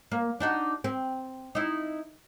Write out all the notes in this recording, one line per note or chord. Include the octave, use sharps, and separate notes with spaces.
A#3
D4 D#4 F#4
C4
D#4 E4